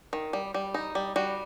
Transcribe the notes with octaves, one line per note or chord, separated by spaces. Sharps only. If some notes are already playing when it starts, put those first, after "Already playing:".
D#3
G3
G3
D#4
G3
G3 F#4